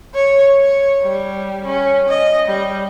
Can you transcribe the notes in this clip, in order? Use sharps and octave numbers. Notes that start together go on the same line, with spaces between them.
C#5
C#5
G3
C#4
D#5
G3